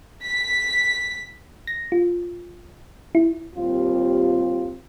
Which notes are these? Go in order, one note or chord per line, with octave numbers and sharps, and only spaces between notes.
B6
A#6
F4
E4
D#2 G3 C4 F4